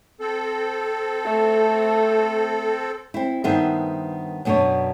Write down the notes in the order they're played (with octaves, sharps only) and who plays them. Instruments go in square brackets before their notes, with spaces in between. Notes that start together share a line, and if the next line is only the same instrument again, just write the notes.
[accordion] C4 A4
[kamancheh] A3
[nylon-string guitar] C4 E4
G2 D#3 B3 C5 E5
F#2 B2 B3 D4 C#5